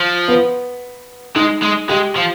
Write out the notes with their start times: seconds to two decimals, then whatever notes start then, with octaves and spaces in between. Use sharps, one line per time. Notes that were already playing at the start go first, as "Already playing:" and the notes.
Already playing: F3
0.28 B3
1.36 G#3 D#4
1.62 G#3
1.89 G#3 G4
2.16 F3